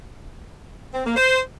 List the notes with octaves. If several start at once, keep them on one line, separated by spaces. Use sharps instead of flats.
C4
A#3
C5